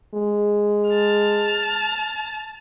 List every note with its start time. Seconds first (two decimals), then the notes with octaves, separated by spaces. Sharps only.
0.14 G#3
0.90 A5 F6